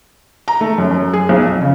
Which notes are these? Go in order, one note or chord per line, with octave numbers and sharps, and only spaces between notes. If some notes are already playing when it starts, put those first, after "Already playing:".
A#5
A3
F#2
F#2
G#4
B1
F2
C#3